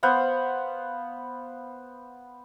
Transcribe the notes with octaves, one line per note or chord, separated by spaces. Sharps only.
B3 C5 F5 F#5